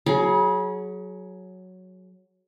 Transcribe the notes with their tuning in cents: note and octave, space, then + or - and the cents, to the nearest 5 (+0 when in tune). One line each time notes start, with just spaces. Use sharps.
F#3 +0 G#4 +25 B5 -35